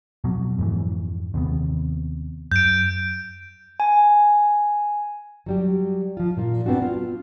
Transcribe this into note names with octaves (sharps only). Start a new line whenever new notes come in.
F2 B2 F#3
F2 G#2 E3
D#2 C3 B3
F#2 G6 D7
G#5
F#3 G3 G4
F3 F4
A#2 A#3 F4
B3 C4 D4 F#4
F4